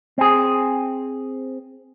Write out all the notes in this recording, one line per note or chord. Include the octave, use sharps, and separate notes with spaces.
C4 G#4